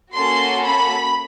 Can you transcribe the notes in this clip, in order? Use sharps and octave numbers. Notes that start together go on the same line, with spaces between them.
A#3 C#4 F#4 A4 C6
B5